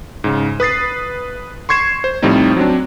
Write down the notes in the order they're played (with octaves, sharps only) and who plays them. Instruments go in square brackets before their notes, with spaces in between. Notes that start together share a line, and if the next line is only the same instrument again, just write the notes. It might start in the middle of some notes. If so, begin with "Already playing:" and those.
[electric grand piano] G#2 C#3
B4 D#6 A6 C7
C6 C#6 G#6 C7 E7
C5
A2 F3 G3 C4 D#4
F#3 C4 D4